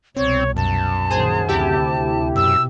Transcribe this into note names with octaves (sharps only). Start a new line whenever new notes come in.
C2 B2 C4 C#5
F#2 A5
A#1 D#3 G#4 C5
D2 C3 E4 G4
F#2 B2 E6